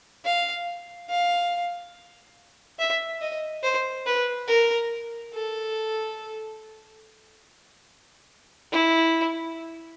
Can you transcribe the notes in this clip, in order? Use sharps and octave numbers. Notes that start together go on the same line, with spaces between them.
F5
F5
E5
D#5
C5
B4
A#4
A4
E4